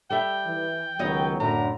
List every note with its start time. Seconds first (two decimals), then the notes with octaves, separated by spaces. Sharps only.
0.10 G3 A4 E5 G5
0.47 E3
0.99 C#2 D#3 F#3 B3 C#5 D#5
1.40 F#2 A2 D3 A#5